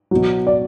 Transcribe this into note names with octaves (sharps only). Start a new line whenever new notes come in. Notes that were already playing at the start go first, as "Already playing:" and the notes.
B2 F#3
D5